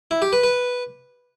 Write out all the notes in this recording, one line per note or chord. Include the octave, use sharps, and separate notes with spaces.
E4
G4
B4
B4